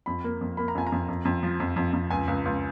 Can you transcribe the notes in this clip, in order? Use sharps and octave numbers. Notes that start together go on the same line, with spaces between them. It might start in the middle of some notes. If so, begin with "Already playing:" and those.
F2 B5
A#3
F2
A#3 B5
A#5
F2 G#5
A#5
F2
F2
F2
F3
F2
F2
F2
C#2 G#5
C#2
C#2